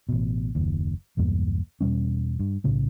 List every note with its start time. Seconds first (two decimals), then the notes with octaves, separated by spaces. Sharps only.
0.09 A1 B2
0.55 F#1 D#2
1.17 B1 E2 G2 A#3
1.81 E2 B2 G3 C#4
2.39 G2
2.64 B1 A2 C#3 A3